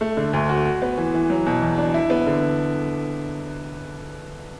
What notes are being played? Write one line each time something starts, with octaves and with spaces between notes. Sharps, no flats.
A3
D3
D2
F#4
F#4
B3
E3
E3
F#3
B2
E2
D4
E4
B3
D3